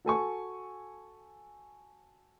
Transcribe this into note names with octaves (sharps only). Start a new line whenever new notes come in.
F#4 A4 G#5 C#6